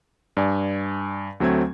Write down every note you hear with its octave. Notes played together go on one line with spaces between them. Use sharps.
G2 D5 G#5
D2 F#3 A3 C4 G#6